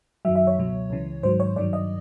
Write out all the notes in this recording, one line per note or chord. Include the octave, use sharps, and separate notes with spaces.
F#2 D#3 F#3 E5
E5
C#5
C#2 B2 F#3
C#2 C#3 E3
G#2 D#3 F#3 C5
C#5
G2 D#3 F#3 D5
D#5